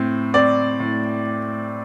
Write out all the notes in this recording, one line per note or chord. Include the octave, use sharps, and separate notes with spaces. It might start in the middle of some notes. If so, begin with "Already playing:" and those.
Already playing: A2 C4
C4 D5
A2